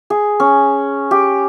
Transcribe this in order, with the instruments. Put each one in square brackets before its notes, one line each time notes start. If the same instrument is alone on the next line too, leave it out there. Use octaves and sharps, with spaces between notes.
[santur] G#4
C#4
G4